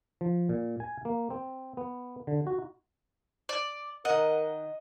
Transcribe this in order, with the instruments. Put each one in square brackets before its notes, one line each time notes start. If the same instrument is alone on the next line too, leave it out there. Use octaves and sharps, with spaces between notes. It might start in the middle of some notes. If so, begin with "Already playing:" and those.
[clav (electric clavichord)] F3
A#2
G#5
A#3
C4
B3
D3
F#4
[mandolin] D5
[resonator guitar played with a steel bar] D#3 F#5 [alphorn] A#4 [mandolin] D#5